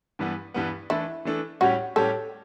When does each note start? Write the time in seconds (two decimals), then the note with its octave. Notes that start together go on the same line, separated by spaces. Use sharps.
0.19 G2 E3 G3 B3
0.54 G2 E3 G3 B3
0.90 E3 A3 D4 E4 A4
1.25 E3 A3 D4 A4
1.61 A2 G3 C#4 F#4 G4 C#5
1.96 A2 G3 C#4 G4 A4 C#5